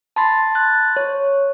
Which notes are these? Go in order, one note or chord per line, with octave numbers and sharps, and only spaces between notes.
A5 B5 C6 A6
F#6 A6
C#5